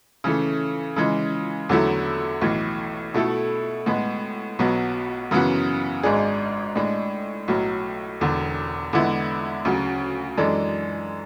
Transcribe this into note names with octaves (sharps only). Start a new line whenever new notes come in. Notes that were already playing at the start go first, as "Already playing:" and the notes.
C#3 E3 A3
C#3 E3 G#3
E2 D3 F#3 A3 E4
B1 A2 E3
B2 A3 E4 A4
A2 G#3 B3
B1 B2 F#3 B3
F#2 C#3 E3 B3 F#4
G#1 G#2 G#3 D4 G#4
A2 G#3 D4
B1 A2 F#3
E1 E2 D3
E2 D3 G#3 B3 E4
D2 C#3 F#3
F#2 E3 G#3 D4 A4